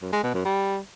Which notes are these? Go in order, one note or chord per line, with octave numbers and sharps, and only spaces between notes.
F#2
G#3
B2
F#2
G3